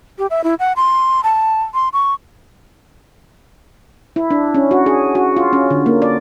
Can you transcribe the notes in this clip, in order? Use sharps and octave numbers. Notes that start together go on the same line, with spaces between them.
G4
E5
E4
F#5
C6
A5
C6
C#6
E4
D4
C#4
F#4
G#4
F#4
F4
C#4
D3
A#3
D5